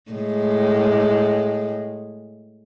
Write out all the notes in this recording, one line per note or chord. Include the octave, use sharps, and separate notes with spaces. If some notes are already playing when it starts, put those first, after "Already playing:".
A2 G#3